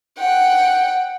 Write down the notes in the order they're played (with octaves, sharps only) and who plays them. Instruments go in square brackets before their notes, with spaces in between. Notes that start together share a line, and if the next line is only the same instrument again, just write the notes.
[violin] F#5 G5